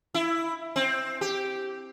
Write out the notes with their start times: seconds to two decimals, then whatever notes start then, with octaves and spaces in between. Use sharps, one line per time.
0.14 E4
0.76 C4
1.21 G4